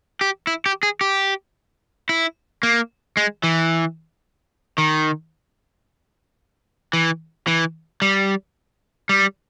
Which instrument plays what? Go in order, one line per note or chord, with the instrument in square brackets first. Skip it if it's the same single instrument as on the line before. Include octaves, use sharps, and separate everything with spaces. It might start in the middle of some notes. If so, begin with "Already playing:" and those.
[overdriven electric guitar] G4
E4
G4
G#4
G4
E4
A#3
G#3
E3
D#3
E3
E3
G3
G3